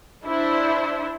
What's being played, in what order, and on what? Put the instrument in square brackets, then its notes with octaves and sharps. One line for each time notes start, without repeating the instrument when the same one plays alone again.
[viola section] D4 E4 C5